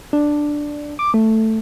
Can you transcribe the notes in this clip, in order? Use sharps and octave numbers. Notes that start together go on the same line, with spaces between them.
D4
D6
A3